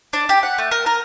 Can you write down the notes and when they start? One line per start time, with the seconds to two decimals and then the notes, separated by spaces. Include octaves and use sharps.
0.13 D4
0.29 G4
0.43 F#5
0.58 A3
0.71 A#4
0.86 A#4